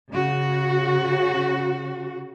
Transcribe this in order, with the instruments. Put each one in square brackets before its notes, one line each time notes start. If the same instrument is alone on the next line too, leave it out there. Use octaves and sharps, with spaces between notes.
[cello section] C#3 F#4